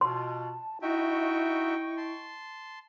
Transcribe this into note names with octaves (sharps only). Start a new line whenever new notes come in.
B2 F4 A5 C6
D#4 E4 F#4 D#5 E5 G5 C#6
A5 C6